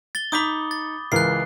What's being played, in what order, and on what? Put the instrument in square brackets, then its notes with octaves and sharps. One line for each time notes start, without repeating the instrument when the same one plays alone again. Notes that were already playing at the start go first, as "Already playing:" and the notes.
[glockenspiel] A6 G7
[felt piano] D#4 G6 B6 [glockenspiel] B5 D6 D#6
[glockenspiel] A6
[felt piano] C#2 E3 A#4 [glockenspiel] F#6 C7